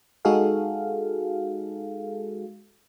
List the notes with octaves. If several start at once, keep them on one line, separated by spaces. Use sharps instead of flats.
G#3 D#4 F#4 G#4 A4 F5